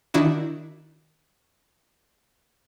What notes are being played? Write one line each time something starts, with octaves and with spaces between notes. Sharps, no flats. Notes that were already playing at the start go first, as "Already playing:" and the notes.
D#3 D4 E4 F#4